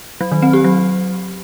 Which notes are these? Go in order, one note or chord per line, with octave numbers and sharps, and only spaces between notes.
F#3
D#3
C4
G4
F#3